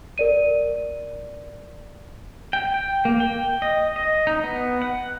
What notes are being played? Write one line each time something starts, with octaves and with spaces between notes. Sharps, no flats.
A#4 D5 D#7
G5
G5
A#3
G5
D#5
D#5
D#4
B3
F#5